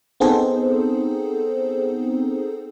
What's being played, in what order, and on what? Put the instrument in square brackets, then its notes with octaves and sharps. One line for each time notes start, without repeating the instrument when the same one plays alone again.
[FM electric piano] B3 C4 D#4 G#4 A4 C5